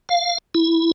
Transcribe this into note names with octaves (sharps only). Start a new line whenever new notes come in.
F5
E4